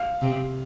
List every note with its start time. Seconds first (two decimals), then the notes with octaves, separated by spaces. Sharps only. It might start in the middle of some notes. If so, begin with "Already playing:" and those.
Already playing: F5
0.21 C3